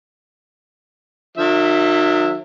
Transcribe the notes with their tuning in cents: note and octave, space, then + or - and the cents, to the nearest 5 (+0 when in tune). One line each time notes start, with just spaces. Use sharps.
D#3 -35 F#3 -40 E5 +0